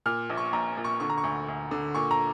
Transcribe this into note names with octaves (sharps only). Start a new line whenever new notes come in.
A#2 F6
A#1
C#6
A#1 A#5
A#2
C#6
D3 C#6
A#5
C#6
D2
D2
D3
A#2 C#6
A#5